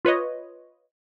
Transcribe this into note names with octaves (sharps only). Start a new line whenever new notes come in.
F4 B4 C#5 D#5